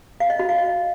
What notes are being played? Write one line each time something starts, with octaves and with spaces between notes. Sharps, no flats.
F5
D#5
F#4
F5
D#5